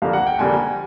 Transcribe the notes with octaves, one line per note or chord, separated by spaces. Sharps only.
F2 D3 G3 A#3 F5
F#5
G5
F2 D3 G3 A#3 G#5